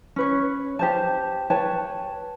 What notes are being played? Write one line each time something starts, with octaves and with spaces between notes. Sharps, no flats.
C#4 B4 C#5
G4 C5 A5
B4 C#5 G5 A5